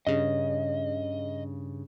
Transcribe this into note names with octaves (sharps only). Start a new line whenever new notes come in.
G2 C#3 D#5